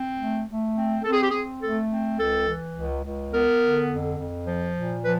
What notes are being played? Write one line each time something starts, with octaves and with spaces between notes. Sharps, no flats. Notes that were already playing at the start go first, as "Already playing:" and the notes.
Already playing: C4
A3
A3
C4
C4 A4
G#4
G4
C4 G#4
A3 A4
C4
C#2 A4
E3
C#2
C#2
B3 A#4
D3
F2
F2
F3
A#2
F3 B4